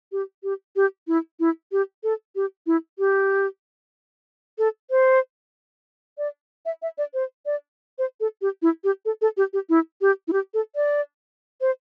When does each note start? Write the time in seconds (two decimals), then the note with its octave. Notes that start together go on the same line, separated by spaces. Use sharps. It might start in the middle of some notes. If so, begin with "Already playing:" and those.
0.12 G4
0.43 G4
0.76 G4
1.08 E4
1.40 E4
1.72 G4
2.03 A4
2.36 G4
2.67 E4
2.99 G4
4.58 A4
4.91 C5
6.18 D5
6.66 E5
6.82 E5
6.98 D5
7.14 C5
7.46 D5
7.98 C5
8.20 A4
8.42 G4
8.62 E4
8.84 G4
9.05 A4
9.22 A4
9.37 G4
9.53 G4
9.69 E4
10.01 G4
10.28 E4
10.33 G4
10.54 A4
10.76 D5
11.61 C5